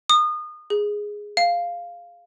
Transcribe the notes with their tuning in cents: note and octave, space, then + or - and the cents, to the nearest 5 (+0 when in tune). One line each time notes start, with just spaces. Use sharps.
D#6 -30
G#4 -5
F5 +0